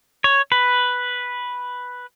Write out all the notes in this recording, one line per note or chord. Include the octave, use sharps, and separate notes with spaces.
C#5
B4